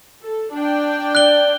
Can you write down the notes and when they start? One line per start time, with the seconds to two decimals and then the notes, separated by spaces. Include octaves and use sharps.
0.24 A4
0.55 D4 G5
1.15 D5 F#6 G7